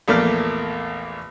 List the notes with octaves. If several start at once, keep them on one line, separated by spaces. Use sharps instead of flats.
A#1 E2 A3 A#3 D5 F6